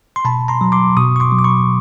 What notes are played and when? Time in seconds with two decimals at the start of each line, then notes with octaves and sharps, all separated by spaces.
0.16 C6
0.25 B2 A5 B5
0.48 A#5 C6
0.61 F#3
0.72 C6 D6
0.97 B2 C#6 D#6
1.16 C#6
1.20 C6 D6
1.32 F#3
1.39 D6
1.44 B5 C#6